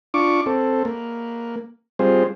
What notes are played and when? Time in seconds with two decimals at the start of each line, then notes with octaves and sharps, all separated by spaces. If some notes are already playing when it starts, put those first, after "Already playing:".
0.14 D4 F4 C#6 D6
0.46 C4 A4
0.85 A#3
1.99 G3 C4 F4 G#4 C5